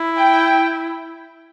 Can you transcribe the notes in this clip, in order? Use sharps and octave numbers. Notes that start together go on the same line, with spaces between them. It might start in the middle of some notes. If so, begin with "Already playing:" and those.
Already playing: E4
G5